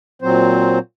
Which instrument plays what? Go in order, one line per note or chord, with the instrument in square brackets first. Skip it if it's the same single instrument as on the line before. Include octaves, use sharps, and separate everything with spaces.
[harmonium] A#2 F#3 C4 C5